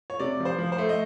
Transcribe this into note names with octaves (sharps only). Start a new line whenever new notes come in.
C#5
C3 D5
F3
C5
F3
C5
A3
D#5